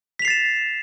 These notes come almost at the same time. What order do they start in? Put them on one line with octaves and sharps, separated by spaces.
B6 F7 C7 A6 E7